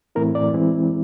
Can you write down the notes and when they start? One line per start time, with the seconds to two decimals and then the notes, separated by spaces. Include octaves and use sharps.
0.15 A2 E3 A3 C4 E4 A#4
0.35 D5
0.54 E3 G#3 C4 E4